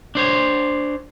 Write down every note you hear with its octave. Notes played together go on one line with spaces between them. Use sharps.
D4 C5 C#5